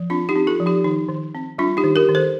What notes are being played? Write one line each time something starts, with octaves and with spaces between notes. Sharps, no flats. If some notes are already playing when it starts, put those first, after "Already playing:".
Already playing: F3
C4 D4 F4
D#4 G4
C4
F4 A4
F3
D#4 G4
D#3 D#4
D#3
C4
G3 D4 F4
D#4 G4
D#3
G4 A#4
D#3
A4 C5